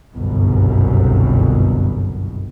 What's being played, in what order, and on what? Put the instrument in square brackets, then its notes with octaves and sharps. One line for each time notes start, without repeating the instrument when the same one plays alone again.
[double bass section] G1 C2 F#2 B2